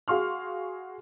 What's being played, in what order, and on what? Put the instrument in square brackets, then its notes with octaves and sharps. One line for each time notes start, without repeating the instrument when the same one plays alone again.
[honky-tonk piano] F#4 G#4 F5 C6 C#6 F6